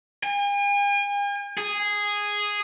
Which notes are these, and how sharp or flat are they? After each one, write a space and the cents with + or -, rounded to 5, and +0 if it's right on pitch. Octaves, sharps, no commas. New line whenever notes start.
G#5 -45
G#4 -5